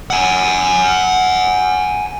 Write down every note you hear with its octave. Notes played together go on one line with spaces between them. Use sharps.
F#5 G#5